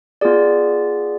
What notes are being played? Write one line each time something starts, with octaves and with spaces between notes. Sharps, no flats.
B3 F4 G#4 D5